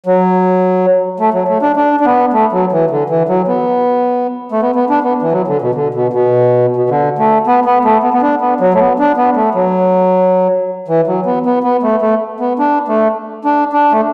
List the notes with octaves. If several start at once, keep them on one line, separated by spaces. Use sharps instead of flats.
F#3
A3
F#3
A3
D4
D4
D4
B3
A3
F#3
E3
D3
E3
F#3
B3
A3
B3
B3
D4
B3
E3
F#3
D3
B2
D3
B2
B2
B2
D3
A3
B3
B3
A3
B3
B3
D4
B3
F#3
A3
B3
D4
B3
A3
F#3
E3
F#3
B3
B3
B3
A3
A3
B3
D4
A3
D4
D4
A3